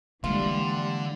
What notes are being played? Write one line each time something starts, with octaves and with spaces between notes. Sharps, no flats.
D3 E3 G3 G#3 A#3 F4